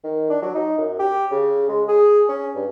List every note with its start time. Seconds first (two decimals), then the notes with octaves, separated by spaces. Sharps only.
0.04 D#3
0.30 D4
0.42 F#3
0.55 D#4
0.78 F#2
0.99 G4
1.31 C#3
1.69 G#3
1.88 G#4
2.29 C#4
2.55 G2